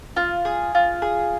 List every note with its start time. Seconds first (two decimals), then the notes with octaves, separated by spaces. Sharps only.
0.17 F4
0.45 G#4
0.75 F4
1.02 G#4